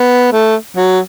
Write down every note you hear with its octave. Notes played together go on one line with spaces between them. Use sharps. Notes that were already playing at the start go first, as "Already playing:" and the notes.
Already playing: B3
A3
F#3